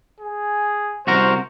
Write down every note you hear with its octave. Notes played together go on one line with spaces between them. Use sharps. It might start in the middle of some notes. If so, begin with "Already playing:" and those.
G#4
C2 F#4 A#4 C5